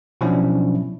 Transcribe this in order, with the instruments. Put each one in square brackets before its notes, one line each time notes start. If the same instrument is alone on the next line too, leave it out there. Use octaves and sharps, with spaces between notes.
[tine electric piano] B2 F3 F#3 C#4 D4 E4